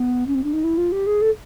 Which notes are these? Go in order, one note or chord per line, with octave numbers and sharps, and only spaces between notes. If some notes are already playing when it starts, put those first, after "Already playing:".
Already playing: B3
C#4
C4
D4
D#4
E4
F4
G4
G#4
A4